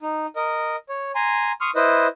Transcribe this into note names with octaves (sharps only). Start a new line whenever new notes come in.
D#4
A#4 D#5
C#5
G#5 A#5 C6
C6 C#6 D#6 F6
E4 B4 C5 D#5